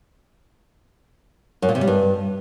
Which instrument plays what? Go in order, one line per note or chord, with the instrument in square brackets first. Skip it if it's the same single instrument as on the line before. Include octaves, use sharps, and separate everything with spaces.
[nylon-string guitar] F#2
A#2
C3
G3
G2